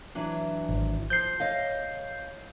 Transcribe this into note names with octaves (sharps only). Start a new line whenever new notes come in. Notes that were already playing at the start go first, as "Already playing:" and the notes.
E3 F#3 D4
G#1
F3 G6 C7
C#5 D#5 F5